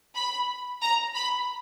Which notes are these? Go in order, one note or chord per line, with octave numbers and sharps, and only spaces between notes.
B5
A#5
B5